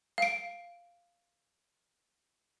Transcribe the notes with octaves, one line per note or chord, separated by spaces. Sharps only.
F5 D7